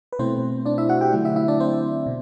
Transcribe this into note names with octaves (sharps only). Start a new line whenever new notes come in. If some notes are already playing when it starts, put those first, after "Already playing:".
B4
B2 A3 C4 E4 C5
D4 D5
E4 E5
F#4 F#5
G4 G5
D3 F#3 A3 E4
E4 E5
E4 E5
D4 D5
C4 C5
B2